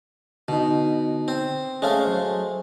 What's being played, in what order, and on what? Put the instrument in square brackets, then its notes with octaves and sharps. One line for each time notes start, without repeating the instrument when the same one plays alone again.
[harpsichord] B2 [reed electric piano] D3 B3 D#4
[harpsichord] C4
[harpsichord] G#3 A3 [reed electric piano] C#4 C#5 F5
[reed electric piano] F#3 C5